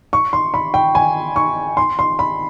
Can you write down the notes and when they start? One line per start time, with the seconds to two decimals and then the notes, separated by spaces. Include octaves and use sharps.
0.13 C#6
0.33 C6
0.54 B5
0.74 G5
0.95 G#5
1.36 C#6
1.77 C6
1.99 C6
2.19 B5